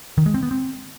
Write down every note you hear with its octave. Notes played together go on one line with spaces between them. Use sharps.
D#3
G#3
C4
B3
C4